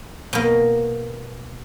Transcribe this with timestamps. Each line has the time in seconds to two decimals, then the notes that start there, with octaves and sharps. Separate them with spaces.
0.33 B2 A#3